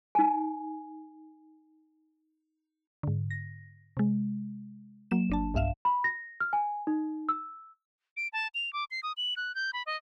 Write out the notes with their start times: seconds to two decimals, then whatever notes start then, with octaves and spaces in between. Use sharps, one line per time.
0.15 D#4 G#5
3.03 G#2 D3
3.31 A#6
3.97 C3 G#3
5.11 F#3 A#3 E7
5.30 G1 D4 A5
5.54 B1 G2 E5 F5 E7
5.85 B5
6.04 A#6
6.40 F6
6.53 G#5
6.87 D#4
7.29 E6
8.17 D7
8.33 A5
8.54 F7
8.73 D6
8.91 C7
9.03 D#6
9.17 F#7
9.37 F#6
9.55 G6
9.73 B5
9.86 D#5